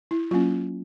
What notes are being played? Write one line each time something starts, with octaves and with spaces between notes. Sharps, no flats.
E4
F#3 A#3 C#4 F4